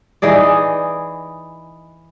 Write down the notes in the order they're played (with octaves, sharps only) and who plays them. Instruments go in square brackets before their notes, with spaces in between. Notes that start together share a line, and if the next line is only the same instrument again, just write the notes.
[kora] E3 D#4 G#4 D5